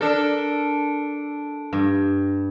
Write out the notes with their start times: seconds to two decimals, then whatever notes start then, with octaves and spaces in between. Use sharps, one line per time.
0.01 D4 A4 A#4
1.73 G2